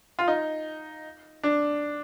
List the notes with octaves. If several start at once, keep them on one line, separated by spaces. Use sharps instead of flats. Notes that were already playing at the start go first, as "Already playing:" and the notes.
F4
D#4
D4